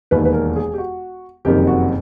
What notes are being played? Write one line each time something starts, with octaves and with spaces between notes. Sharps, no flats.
E1 D#2 D#3 B4
B4
A#4
G#4
G4
F#4
F#1 F2 C3 D#3 G4
F#4